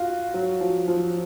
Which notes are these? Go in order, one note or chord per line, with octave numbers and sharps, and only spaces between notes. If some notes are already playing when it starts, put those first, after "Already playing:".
Already playing: F4 F#4
F#3
F3
F3